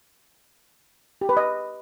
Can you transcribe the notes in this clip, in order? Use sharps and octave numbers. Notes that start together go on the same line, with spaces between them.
G4
B4
D#5